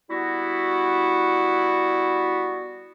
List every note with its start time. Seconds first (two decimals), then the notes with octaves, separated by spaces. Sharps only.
0.10 G3 B3 E4 F#4